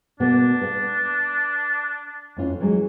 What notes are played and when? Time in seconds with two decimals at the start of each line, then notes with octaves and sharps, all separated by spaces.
0.20 B2 A#3 B3 D4
0.62 B4 F5
2.37 F2 C#4 F4
2.60 E3 F#3 G#3